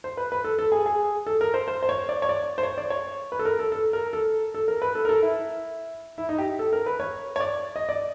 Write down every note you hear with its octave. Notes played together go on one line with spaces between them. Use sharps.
C5
B4
B4
A4
A4
G#4
G#4
A4
A#4
C5
C5
C5
C#5
D5
C#5
D5
C5
C#5
D5
C#5
B4
A4
A#4
A4
A4
A#4
A4
A4
A#4
B4
A4
A#4
A4
E4
E4
D#4
G4
A4
A#4
B4
C#5
C#5
D5
D#5
D5